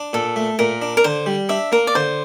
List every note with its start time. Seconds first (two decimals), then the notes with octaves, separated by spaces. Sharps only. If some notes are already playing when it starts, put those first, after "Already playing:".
Already playing: D4
0.13 A#2 A4
0.36 A3
0.59 A#2 A#4
0.82 D4
0.97 A#4
1.04 D3 C5
1.26 G3
1.49 D4 E5
1.72 A#3 A#4
1.87 D5
1.95 D3 C5